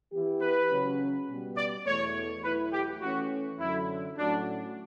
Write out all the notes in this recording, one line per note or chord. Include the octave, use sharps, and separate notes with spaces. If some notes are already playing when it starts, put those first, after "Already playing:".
E3 B3 E4 G4
B4
C#3 F#3 C#4
B2 G3 B3
D5
E2 B2 A3 C#5
E2 B2 F#3 A3 E4 B4
G4
E3 A3 C#4 F#4
F#2 D3 F#3 E4
A2 F#3 A3 C#4 D4 F#4